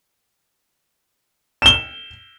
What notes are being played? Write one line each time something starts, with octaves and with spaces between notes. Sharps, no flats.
E7 G7